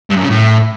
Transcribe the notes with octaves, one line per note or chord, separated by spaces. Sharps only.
G2
F#2
C#3
A2